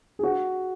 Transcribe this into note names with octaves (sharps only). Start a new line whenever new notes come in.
G#4
F#4